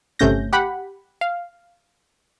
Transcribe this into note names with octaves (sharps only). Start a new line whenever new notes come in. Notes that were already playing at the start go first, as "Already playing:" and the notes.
G1 C3 A3 C#4 G6 A#6
G4 F#5 B5
F5